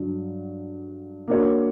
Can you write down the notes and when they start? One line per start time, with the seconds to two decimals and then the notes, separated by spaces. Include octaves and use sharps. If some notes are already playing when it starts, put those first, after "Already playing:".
Already playing: G2 D3 F#3
1.28 A#3 D4 F#4 C#5